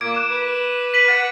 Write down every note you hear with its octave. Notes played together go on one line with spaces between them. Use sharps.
A#2 A#3 D6 G#6 D7
F#6 E7
B4
B6 D#7 F#7
F#5 A6 D#7